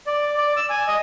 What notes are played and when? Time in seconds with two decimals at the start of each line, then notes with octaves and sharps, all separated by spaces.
0.06 D5
0.37 D5
0.57 E6
0.70 G#5
0.88 D#5